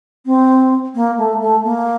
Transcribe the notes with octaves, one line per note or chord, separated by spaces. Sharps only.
C4
A#3
A3
A3
A#3